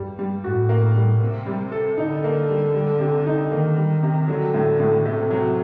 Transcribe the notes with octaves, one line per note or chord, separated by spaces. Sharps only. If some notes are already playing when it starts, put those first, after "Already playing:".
Already playing: G2 G3
G3
A2 F#4
A#3
G3
C3 A#3
G3
A4
D3 D#4
A#3
G3
G3
C3
D#4
D#3 A#3
G3
C3
D3 F#3
A2
A2
C3 A3
F#3